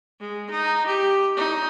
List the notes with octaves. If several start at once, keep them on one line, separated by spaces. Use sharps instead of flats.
G#3
D#4
G4
D#4